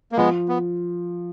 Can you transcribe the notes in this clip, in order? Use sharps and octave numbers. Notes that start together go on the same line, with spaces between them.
A#3
F3 G#3 B3
B3